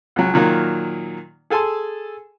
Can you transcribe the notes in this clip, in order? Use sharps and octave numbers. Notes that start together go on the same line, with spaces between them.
C#2 F#3
A#2 D#3 F#3 A#3
G#4 A4 G#5 A5 C6